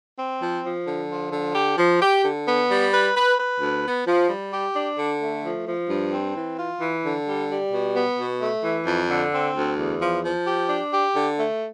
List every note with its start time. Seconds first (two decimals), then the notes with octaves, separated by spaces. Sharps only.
0.18 C4
0.40 F3
0.63 F3
0.87 D3
1.09 F3
1.32 D3
1.55 G4
1.78 F3
2.01 G4
2.24 D3
2.47 B3
2.70 G3
2.92 B4
3.15 B4
3.38 B4
3.60 D2
3.84 B3
4.06 F3
4.30 G3
4.52 G4
4.74 D4
4.98 D3
5.21 A3
5.44 F3
5.67 F3
5.90 G2
6.12 C4
6.34 E3
6.58 F4
6.80 E3
7.04 D3
7.26 G3
7.50 G3
7.71 B2
7.95 B3
8.18 B2
8.41 A3
8.63 E3
8.87 F2
9.10 D3
9.33 C4
9.55 D2
9.78 E2
10.01 F3
10.24 F3
10.46 G4
10.69 D4
10.92 G4
11.15 D3
11.38 A3